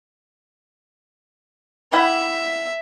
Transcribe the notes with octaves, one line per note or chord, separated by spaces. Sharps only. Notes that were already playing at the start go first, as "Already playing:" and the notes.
G3 E4 E5 F#5